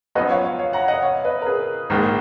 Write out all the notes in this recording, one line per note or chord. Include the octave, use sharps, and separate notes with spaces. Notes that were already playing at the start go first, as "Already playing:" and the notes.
F#2 F3 B3 B4 D#5
C#5 F5
C#5 F5
C#5 F5
F#5 A#5
D#5 F#5
C#5 F5
B4 D#5
A#4
G#4 B4
A#1 G#2 D#3 A#3